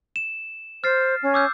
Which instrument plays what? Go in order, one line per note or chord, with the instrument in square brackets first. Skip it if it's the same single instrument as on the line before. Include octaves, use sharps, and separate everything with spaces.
[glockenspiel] E7
[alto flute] C5 [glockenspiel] F6 A6 C7
[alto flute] C#4
[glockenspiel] D6 E6 G6